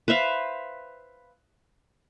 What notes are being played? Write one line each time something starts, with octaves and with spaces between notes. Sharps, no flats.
B4 C5 E5 F5